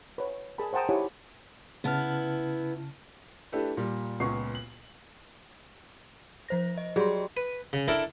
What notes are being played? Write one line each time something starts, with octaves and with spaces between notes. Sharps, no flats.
B4 C#5
G#4 A#4 A5 B5
C5 F#5 G5 A5 A#5 D#6
D#4 E4 G4 C#5 F#5 G#5
C#3 B3 E4 A5 F6
A3 D4 E4 G4 A4 B4
A#2 G3
C#2 A#2 B3 C#6 C7
F#7
F3 C5 A#6
D#5
F#3 G3 G#4 C6
B4
C#3
D4 E4 A4 A#4